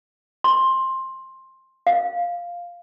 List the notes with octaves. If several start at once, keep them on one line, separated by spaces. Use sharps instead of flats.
C6
F5